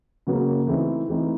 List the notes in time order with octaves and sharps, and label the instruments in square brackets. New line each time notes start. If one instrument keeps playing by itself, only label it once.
[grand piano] C#3 F#3 A#3
E3 A3 C4 D#4
E3 A3 C4 D#4